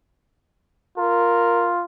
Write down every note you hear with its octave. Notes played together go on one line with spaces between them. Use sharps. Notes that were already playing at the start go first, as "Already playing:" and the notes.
F4 A#4